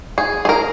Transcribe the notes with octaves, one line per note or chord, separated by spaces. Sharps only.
G#4
G#4
A#4